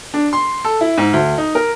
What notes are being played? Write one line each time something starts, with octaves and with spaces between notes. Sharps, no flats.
D4
C6
A4
E4
G#2
D2
D#4
A#4